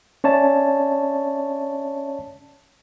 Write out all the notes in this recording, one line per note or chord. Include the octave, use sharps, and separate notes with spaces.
C#4 C#5 D5 E5 A5